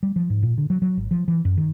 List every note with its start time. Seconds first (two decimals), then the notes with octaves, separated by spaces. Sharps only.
0.03 G3
0.16 F3
0.30 G#2
0.43 A#2
0.58 D3
0.70 F#3
0.82 F#3
0.97 G#1
1.11 F3
1.28 E3
1.45 F#2
1.57 D#3